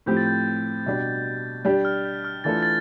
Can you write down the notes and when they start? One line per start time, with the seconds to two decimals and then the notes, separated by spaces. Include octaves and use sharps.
0.06 A2 F3 C4 G4 G6
0.17 A6
0.27 G6
0.86 B2 G3 D4 G4
1.65 G3 D4 G4 G6
1.85 F6
2.05 G6
2.24 F6
2.44 E3 A3 D4 F4 A4 A6
2.63 A6